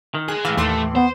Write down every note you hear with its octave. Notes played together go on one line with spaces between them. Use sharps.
D#3
G#3 G#4 F#6
A2 E3 F5
D#2 A3 C6 D6
B3 C5